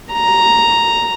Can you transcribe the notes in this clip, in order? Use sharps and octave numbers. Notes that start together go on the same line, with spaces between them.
A#5